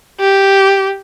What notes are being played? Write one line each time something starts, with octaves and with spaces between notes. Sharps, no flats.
G4